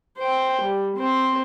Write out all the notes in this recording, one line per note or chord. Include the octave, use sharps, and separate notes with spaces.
C5 G5
G3
C4 C5